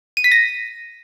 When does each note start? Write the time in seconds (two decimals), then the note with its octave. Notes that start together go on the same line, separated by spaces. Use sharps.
0.17 D#7
0.24 B6
0.32 A#6